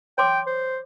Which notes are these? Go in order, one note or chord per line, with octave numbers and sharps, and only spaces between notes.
C#5 G5 C6 D6
C5